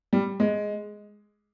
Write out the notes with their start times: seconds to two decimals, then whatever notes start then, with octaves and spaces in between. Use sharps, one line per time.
0.13 G3
0.40 G#3